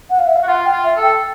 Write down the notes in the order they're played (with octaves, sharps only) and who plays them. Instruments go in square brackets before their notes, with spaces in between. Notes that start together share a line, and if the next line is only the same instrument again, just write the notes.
[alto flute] F#5
F5
E5
F5
[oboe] F#4
[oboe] F4 [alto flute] F#5
[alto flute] G5
[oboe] F4
[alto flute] E5
[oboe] A4
[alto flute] G5